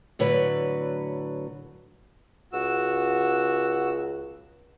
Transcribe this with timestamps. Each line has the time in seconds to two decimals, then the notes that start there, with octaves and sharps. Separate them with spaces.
0.19 A2 D3 F#3 B4
2.53 C#2 F#4 E6